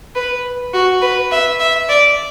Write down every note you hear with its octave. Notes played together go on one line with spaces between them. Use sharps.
B4
F#4
B4
E5
E5
D5